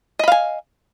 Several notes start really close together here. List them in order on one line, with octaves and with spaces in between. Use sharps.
D#5 B5 F5 G#5